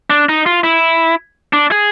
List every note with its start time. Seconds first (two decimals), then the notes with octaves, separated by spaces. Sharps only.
0.10 D4
0.29 D#4
0.46 F4
0.64 E4
1.53 D4
1.71 G#4